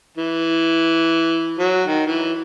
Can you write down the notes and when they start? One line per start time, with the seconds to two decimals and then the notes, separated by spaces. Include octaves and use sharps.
0.17 E3
1.59 F#3
1.83 D#3
2.06 E3